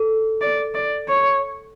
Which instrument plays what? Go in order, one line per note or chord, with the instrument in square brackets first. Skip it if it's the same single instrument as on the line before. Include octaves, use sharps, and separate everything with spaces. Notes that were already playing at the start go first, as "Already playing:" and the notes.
Already playing: [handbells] A4
[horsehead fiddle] D5
D5
C#5